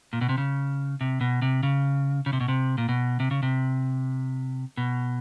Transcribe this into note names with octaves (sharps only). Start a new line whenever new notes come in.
A#2
B2
C3
C#3
C3
B2
C3
C#3
C#3
C3
B2
C3
A#2
B2
C3
C#3
C3
B2